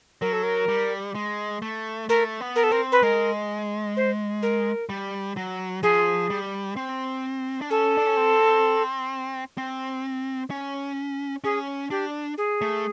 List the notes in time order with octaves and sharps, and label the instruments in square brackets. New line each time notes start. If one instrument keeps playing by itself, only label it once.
[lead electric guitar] F#3 [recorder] A#4
[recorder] A4
A#4
[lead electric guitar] G3
G#3
A3
[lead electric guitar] A3 [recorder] A#4
[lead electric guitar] B3
[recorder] A#4
A4
[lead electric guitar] C4 [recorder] A#4
[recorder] B4
[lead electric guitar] G#3 [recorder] A#4
[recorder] C5
A#4
[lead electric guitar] G3
F#3
[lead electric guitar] F3 [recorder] G#4
[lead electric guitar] G3
C4
D4
[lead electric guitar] C#4 [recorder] A4
[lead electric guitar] D4
C#4
C4
C4
C#4
[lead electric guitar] C#4 [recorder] G#4
[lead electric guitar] D4 [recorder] G4
[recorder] G#4
[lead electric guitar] A3